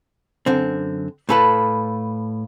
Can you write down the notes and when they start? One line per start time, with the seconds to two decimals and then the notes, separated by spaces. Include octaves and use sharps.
0.46 F#2 D3 C4
1.29 A2 A4 B4 F5 A5 B5